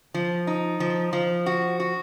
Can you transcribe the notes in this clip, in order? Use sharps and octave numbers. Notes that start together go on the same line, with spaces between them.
F3
D#4
F3
F3
F#4
F#4